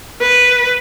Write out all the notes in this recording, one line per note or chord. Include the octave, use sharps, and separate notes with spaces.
B4